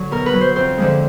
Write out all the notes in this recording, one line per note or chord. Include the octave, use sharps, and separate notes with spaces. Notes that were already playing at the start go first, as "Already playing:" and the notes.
Already playing: D3 F#3
B2 A#4
B4
F#3
C5
F2 C5
D3 F3 G#3